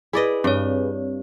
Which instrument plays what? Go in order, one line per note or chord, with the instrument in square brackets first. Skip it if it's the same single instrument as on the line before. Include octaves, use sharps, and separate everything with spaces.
[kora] E4 D5 D#5 [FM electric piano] G#4 B4
[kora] G2 [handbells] C4 C#5